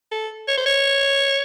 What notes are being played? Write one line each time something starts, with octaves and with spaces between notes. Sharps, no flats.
A4
C#5
C5
C#5